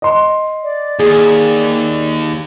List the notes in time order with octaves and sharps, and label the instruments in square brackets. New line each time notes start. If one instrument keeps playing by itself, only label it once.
[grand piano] D#5 C6
[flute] D5
[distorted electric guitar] D#2 [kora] G#4